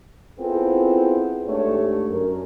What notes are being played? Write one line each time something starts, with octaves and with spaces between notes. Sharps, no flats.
B3 C4 E4 F4 G#4 A4
G#2 A3 D4 G4 C#5
F#2 A#4